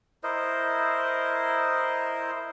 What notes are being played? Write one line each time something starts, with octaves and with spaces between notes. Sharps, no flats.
E4 A#4 C5 D#5